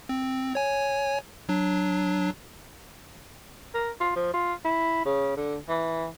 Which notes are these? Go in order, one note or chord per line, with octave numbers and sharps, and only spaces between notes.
C4
C#5 G#5
F#3 D4
A#4
F4
F3
F4
E4
C#3
D3
E3